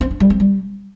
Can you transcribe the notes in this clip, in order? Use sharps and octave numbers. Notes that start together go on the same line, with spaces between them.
C4
D4
G3
C4
G3